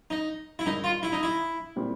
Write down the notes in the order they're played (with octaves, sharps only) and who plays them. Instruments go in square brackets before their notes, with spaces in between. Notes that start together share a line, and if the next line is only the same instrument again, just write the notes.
[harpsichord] D#4
E4
[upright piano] G2 D#3 G3 [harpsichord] D#4
[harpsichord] F4
E4
D#4
E4
[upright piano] A#2 G3 C4 E4 G4